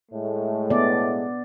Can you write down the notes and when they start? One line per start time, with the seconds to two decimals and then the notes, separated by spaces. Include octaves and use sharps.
0.12 A2 G#3 A3
0.70 B3 D5